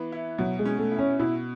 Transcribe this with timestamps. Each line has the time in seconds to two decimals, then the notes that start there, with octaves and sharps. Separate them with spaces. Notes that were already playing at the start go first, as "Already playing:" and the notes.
Already playing: E3 B3
0.12 E4
0.38 B2 F#3
0.59 G#3
0.65 C#4
0.79 A3
0.92 E4
0.99 C#4
1.19 B2 E4